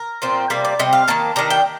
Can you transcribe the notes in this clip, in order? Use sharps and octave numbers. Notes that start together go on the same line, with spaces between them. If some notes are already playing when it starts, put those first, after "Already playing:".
Already playing: A#4
A#2 F3 C4
C3 G3 A#3 D5
D5
C3 G3 C4 D#5
F5
D#3 A#3 A5
D#3 G3 D4 A#5
G5